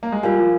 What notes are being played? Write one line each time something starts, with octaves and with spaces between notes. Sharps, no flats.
A#3
G#3
G3 F4 A#4 F5 G#5
F3